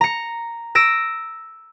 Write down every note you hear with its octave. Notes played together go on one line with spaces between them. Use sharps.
A#5 C#7
E6 A#6 D7